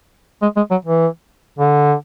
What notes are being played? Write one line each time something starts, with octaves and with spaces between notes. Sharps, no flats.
G#3
G#3
F#3
E3
D3